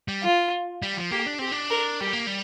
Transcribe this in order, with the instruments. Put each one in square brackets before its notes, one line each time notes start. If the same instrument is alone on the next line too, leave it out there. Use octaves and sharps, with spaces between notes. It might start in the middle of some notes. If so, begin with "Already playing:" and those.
[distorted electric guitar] G3
[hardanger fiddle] F4
[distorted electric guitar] G3
F3
[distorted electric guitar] A#3 [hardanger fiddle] G4
[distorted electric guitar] D4
[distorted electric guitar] C4 [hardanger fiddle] G4
[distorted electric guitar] D4
[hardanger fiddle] A#4
[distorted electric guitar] G3 [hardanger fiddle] G4
[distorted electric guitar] A#3
G3